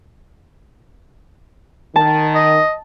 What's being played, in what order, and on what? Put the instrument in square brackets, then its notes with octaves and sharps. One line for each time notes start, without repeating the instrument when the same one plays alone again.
[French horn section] D#3 [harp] A5
[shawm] D#5